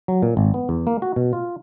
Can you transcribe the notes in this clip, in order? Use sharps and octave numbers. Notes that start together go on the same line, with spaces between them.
F#3
A#2
G#1
B3
E2
A#3
F#4
B2
F4